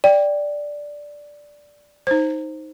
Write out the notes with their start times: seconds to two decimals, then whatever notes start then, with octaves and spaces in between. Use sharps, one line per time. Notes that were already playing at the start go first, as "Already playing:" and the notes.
0.04 D5 G5
2.07 D#4 C5